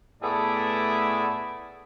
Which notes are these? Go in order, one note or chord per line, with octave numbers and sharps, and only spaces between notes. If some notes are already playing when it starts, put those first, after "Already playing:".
A2 A3 B3 G#4 D5 E5